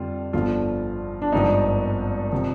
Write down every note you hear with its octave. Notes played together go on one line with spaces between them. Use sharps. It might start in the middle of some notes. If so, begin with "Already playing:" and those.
Already playing: F2 D3 G3 F4
G1 G2 D3 F3 F4
D4
G#1 G2 F3 D#4
C3 F3